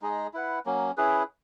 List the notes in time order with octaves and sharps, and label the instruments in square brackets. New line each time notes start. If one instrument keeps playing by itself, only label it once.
[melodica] G#3 D#4 G#4 D#5
E4 B4 F#5
F#3 A#3 C#4
C#4 E4 G#4 B4